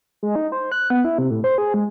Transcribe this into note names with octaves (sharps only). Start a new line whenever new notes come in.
G#3
D#4
C5
F#6
B3
E4
C3
A2
C5
G#4
G#3